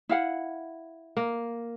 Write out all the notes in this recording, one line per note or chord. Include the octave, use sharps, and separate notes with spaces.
E4 F5 F#5
A#3